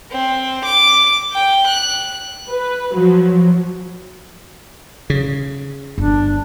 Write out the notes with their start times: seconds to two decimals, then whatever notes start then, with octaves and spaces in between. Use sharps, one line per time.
0.12 C4
0.65 D6
1.33 G5
1.67 F#6
2.49 B4
2.94 F3 F#3
5.10 C#3
5.98 G1 D4